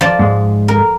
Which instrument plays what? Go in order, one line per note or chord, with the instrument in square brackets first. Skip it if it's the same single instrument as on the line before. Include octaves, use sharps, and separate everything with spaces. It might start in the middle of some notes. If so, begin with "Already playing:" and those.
[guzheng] F3 D5
[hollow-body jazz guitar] G#2 G#3
[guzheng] A#4